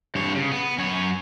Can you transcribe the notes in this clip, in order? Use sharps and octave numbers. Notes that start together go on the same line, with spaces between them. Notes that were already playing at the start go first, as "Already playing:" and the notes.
G2 C#5
C#3
B3
F#2 C#5